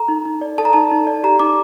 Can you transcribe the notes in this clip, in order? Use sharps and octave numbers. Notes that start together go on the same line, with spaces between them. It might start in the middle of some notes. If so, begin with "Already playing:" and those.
Already playing: A4 A#5
D#4
D#4
D5
A4 A5
A#5
D#4 A5
D#4
D5
G4 A#5
D#4 D6